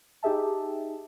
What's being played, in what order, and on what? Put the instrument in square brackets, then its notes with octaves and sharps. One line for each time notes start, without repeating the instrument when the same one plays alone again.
[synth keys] D#4 G4 G#4 E5 A5